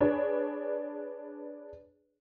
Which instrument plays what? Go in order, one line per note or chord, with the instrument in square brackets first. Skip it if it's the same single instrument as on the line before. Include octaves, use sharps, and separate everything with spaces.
[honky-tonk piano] D4 G#4 B4 C#5 D5